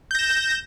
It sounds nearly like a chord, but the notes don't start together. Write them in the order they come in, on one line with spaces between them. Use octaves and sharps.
G6 A#6 E7